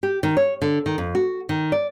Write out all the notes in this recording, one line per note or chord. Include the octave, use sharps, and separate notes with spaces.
G4
D#3
C#5
D3
D#3
F2
F#4
D#3
D5